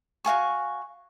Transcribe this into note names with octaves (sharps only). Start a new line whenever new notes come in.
F#4 F5 G#5 C#6